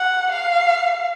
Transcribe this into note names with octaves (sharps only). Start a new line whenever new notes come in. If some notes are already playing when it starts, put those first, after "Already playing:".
Already playing: F#5
F5